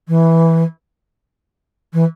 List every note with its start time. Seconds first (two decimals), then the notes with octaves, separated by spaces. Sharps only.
0.08 E3
1.93 E3